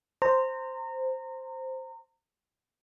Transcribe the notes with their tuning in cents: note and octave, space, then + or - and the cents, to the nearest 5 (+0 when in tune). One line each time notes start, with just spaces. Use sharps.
C5 +0 A#5 -25